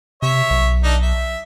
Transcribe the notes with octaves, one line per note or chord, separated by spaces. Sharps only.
C3 C#5 E5
B1
D4 D#4 A4
E5